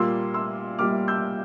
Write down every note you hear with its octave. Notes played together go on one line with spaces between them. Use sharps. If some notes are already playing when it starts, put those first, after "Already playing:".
Already playing: A#2 G3 A#3 C6 E6
C6 E6
A#2 G3 A#3 D6 F6
E6 G6